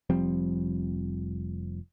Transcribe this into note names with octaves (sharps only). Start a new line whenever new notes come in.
F1 F3 G3 C4